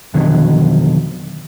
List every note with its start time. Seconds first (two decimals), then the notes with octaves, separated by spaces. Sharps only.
0.14 F2 B2 D3 D#3 F#3